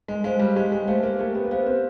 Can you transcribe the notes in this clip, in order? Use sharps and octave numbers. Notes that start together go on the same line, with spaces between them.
G#3
G#3 C5 F5
G3
G#3 G4
G#3
A3 C5 F5
A#3
A3 G4
B3
A#3
B3 C5 F5
C4